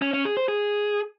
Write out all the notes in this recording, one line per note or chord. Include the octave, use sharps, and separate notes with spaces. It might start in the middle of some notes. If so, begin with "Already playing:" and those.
C#4
C#4
G#4
C5
G#4